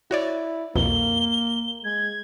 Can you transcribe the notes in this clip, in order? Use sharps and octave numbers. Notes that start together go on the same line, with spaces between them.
E4 F#4 C#5 D5
C2 F2 B2 A#3 G7
G#3 G#6